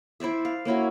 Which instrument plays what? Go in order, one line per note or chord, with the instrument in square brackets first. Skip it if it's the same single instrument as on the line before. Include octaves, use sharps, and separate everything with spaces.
[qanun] E4 C5 D5 E5
F5
A#3 C#4 E4 F#4